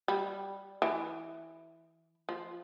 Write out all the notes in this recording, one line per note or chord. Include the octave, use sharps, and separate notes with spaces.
G3
E3
F3